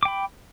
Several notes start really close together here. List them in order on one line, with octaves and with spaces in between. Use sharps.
D6 G5 B5